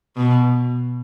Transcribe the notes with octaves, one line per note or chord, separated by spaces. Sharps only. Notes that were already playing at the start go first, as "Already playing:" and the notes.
B2